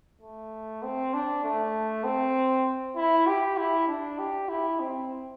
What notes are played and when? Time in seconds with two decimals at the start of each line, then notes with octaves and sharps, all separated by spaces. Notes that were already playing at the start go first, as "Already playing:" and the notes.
0.22 A3
0.83 C4
1.14 D4
1.44 A3
2.04 C4
2.96 E4
3.27 G4
3.57 E4
3.88 D4
4.19 G4
4.49 E4
4.80 C4